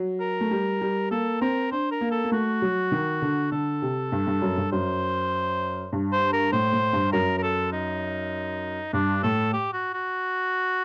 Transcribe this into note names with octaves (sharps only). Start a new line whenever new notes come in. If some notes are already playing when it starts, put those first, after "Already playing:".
Already playing: F#3
A#4
A3
G3
G3
A#3 A4
C4 A#4
D4 C5
A#4
A#3
A4
A#3
A3 F#4
F#3
D#3
D3
D3 A4
C3
G2
G2
F#2
G2
F#2 C5
G2
C5
A#4
A2 C5
A2
G2
F#2 A#4
A#4
A4
D#4
G2 D4
A2 A4
G4
F#4
F#4